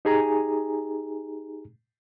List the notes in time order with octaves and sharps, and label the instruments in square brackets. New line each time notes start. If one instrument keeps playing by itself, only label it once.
[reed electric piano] D#4 G4 G#4 G#5 A#5